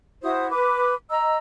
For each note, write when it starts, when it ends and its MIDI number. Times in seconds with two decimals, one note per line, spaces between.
0.23 0.48 64
0.23 0.48 66
0.23 0.48 72
0.23 0.48 87
0.49 0.94 71
0.49 0.94 86
1.10 1.37 75
1.10 1.37 82
1.10 1.37 88